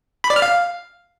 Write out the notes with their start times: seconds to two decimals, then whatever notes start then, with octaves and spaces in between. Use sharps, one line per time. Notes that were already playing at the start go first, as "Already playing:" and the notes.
0.24 B5
0.30 D5
0.36 F6
0.42 F5